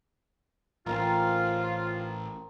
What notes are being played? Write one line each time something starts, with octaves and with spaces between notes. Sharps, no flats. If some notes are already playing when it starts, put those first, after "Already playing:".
A1 C4 F4 A#4